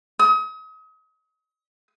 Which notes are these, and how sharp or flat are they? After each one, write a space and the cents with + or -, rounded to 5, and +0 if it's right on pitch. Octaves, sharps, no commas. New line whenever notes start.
D#6 +35